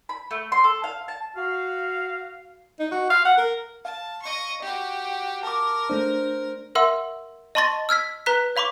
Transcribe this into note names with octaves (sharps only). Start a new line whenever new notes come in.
B5
A3
C6
A4
F5
A5
F#4 F5
D#4
F#4
F5
F#5
A#4
F5 A5
D#5 C#6
F#4 G4
A#4 A5 D6
A3 D4 C5
A#4 E5 F#5 C6 E6
D#5 A5 C6 C#6 A6 A#6
E6 F6 G#6 B6
B4 A#5 F#6 B6
C#5 F5 B5 C#6 D6